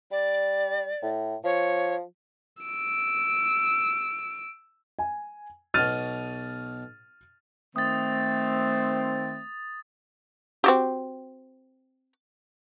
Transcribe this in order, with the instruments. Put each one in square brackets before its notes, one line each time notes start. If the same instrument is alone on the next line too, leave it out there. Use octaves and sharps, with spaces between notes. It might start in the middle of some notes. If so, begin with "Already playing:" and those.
[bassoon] G3 [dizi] D5
[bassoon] A2
[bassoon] F3 [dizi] C#5
[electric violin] E6 D7
[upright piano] G#5
[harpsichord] B1 B2 [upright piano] F6 A6 D#7
[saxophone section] D#3 C4 [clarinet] A3 [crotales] D#6 A6
[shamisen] C4 F#4 G4